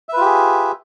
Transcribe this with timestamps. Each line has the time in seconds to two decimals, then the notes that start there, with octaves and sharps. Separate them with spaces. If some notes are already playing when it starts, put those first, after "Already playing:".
0.09 E5
0.13 B4
0.17 F4
0.21 G4
0.25 G#4